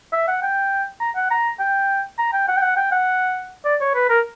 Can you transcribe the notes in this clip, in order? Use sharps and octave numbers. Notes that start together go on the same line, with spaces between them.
E5
F#5
G5
A#5
F#5
A#5
G5
A#5
G5
F#5
G5
F#5
G5
F#5
D5
C#5
B4
A#4